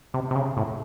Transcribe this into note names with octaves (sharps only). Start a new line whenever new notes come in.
C3
C3
C#3
A2